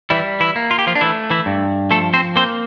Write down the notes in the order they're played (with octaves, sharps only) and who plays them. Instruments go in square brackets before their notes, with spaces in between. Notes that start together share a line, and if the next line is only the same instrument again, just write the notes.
[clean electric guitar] E3 G3 E4
E3 E4
A#3
F4
G4
F3 F4
D4
E3 A3 E4
E3 E4
G2
F3 A3 A4
C4 C5
A#3 C4 C5